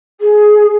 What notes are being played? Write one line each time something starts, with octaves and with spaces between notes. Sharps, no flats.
G#4